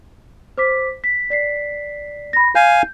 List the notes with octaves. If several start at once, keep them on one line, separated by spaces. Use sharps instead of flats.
C5 D6 B6
B6
D5 B6 C7
B5 A#6
F5 G#5 G6